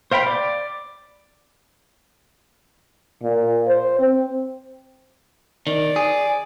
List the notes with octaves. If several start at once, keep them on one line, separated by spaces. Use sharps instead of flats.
C5 F5 G5 B5
D5
A#2
C5
C4
D#3 D5
G#4